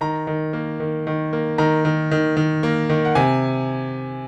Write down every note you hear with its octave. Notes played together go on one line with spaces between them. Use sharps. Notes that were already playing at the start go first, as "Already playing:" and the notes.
D#3 A#5
D#3
A#3
D#3
D#3
A#3
D#3 A#5
D#3
D#3
D#3
A#3
D#3
F#5
C3 G#5